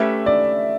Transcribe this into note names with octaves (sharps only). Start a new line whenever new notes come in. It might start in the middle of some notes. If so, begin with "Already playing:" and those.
Already playing: A3 C#4 G4 B4 E5
D5